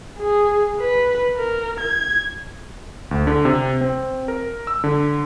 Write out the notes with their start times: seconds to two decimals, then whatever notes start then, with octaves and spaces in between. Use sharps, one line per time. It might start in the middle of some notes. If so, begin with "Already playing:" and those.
0.19 G#4
0.81 B4
1.37 A#4
1.81 G#6
3.11 D2
3.27 D3
3.45 C3
3.81 C4
4.28 A#4
4.67 E6
4.84 D3